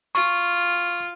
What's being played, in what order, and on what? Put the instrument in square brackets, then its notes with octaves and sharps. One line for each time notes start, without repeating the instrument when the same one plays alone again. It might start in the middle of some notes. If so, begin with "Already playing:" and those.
[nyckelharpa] F4 [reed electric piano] C#6